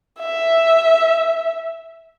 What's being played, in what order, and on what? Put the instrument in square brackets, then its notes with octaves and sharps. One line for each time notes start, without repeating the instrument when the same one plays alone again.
[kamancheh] E5